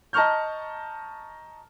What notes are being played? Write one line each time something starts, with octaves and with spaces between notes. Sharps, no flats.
D#5 A5 A#5 C#6 F6 G6